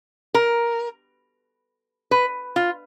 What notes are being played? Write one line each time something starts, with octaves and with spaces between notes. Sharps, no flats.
A#4
B4
F4